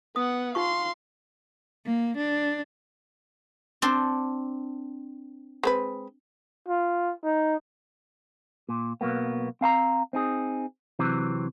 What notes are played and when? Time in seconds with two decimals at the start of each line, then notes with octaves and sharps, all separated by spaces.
0.16 B3 F#5 D#6
0.55 D#4 F4 F5 C6 C#6
1.86 A#3
2.18 D4
3.82 C4 D4 C5
5.63 G#3 C4 B4
6.68 F4
7.24 D#4
8.69 A#2
9.01 B1 F#3 A#3 B3
9.61 C4 F5 A5 A#5
10.13 C4 D#4 G#4
10.99 C3 E3 F#3 C4